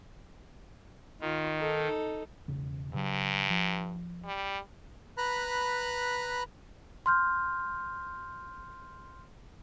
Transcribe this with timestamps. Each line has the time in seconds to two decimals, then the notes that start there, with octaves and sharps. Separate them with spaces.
1.21 D#3 F4
1.59 D#4 A4
2.48 E1 C#3
2.94 G2 C#3 F#3
3.50 F3
4.25 G3
5.18 B4 A#5 B5 F#6
7.06 C6 F6 G6